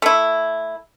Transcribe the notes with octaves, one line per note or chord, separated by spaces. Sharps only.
A3 E4